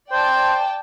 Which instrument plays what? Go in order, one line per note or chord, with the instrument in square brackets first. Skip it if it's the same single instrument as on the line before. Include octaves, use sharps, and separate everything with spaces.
[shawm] C5 [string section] D5 G5 A5